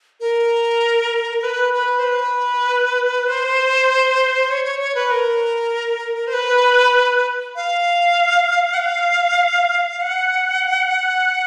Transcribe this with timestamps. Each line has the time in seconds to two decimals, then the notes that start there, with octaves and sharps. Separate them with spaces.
0.20 A#4
1.43 B4
1.73 B4
1.99 C5
2.04 B4
3.27 C5
4.50 C#5
4.65 C#5
4.80 C#5
4.95 B4
5.11 A#4
6.27 C5
6.34 B4
7.56 F5
8.74 F#5
8.78 F5
10.01 F#5